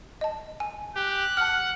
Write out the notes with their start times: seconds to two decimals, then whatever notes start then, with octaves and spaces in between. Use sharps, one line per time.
0.21 D#5 A5
0.60 G#5
0.96 G4 F#6
1.37 F#5 A5 F6